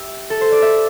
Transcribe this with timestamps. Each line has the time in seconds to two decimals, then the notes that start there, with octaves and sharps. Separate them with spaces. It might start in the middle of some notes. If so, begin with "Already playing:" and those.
Already playing: G4 E5
0.30 A4
0.41 C5
0.52 D5
0.62 E5